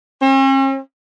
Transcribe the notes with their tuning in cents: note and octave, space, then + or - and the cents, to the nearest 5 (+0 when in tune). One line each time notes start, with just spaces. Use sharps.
C#4 -45